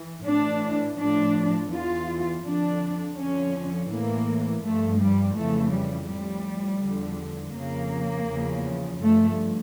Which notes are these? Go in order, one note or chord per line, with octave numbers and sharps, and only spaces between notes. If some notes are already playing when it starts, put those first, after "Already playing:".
Already playing: E3
A2 E3 D4
A2 F3 D4
E2 E3 F4
F2 D3 F3 D4
F2 D3 F3 C#4
A2 E3 A#3
G2 F3 A3
G3
F2 C#3 E3 A3
G3
A2 F3 G3
E2 D3 F3
F2 C#3 F3 A#3
E2 C#3 F3
G2 F3 A3